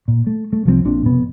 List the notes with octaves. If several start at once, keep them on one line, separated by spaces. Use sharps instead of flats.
A#2
A3
A3
C2 F3 F#3 C4
A#1 A#2 C4 D4
F1 B2 B3